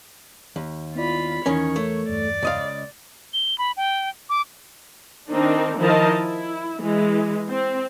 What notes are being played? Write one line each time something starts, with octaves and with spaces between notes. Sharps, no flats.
D#2
B3 E4 F4 D5 B5
E2 D#3 E3 C#4 A#4 C#5
A3
E2 G2 D5
C#2 D#5 F5
G7
B5
G5
D6
D#3 C4 D4 D#4
D#3 F3 E4 A#4 D#5 A5
E4
E3 G#3
C4